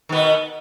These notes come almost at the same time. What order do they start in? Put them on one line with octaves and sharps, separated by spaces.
D#3 B3 B2